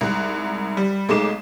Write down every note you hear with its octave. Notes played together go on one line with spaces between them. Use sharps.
C2 G#2 F#6
G3
B1 G#3 A3 D#4 D6 E7